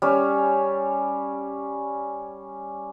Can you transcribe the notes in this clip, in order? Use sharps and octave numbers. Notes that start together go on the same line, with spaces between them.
G3 C#4